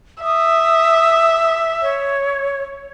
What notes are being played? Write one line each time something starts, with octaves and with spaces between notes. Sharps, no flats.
E5 D#6
C#5